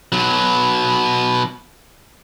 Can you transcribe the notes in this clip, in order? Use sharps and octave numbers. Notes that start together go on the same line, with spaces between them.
B2 F#3